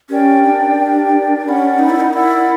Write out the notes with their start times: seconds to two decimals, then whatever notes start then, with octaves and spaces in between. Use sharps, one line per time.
0.09 C#4 G4 A#4 D5 G5
0.43 D4
0.77 G4 A#4 D5 G5
1.45 C#4 D4 A#4 D5 F#5 B5
1.79 D#4
1.90 E4
2.00 D#4
2.13 E4 A#4 D5 F#5 B5